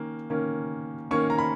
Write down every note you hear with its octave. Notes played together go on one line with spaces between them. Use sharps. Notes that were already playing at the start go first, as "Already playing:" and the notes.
Already playing: D#3 A#3 C#4
D#3 A#3 C#4
D#3 A#3 C#4 C#6
A#5
B5